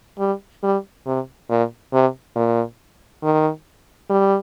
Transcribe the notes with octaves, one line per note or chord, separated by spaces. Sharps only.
G3
G3
C3
A#2
C3
A#2
D#3
G3